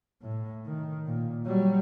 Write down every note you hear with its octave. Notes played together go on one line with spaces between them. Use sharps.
A2
D#3
A#2
F#3 G3